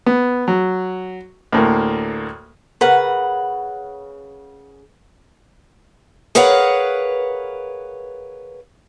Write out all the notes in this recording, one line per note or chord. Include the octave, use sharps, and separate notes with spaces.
B3
F#3
D2 A2 A#3
C#3 A#4 B4 F#5
G#4 A#4 B4 C#5 F5 F#5